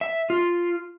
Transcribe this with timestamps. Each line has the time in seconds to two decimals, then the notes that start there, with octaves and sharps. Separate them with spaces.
0.01 E5
0.30 F4